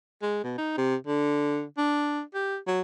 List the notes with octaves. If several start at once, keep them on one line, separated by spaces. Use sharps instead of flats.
G#3
B2
D#4
C3
D3
D4
G4
F#3